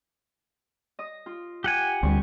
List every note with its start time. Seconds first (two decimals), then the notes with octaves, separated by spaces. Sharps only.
0.99 D#5 D#6
1.26 F4
1.64 G4 F#5 G#5
2.03 D2 G3 C4 C#6